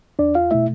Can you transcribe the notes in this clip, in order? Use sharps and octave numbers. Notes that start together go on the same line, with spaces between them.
E2 D4 D5
F4 F5
B2 A3 E4 E5